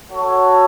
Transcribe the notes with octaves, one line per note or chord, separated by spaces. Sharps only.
F#4 A4 C#5